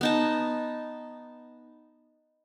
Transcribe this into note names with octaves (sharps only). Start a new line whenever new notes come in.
B3 D#4 A5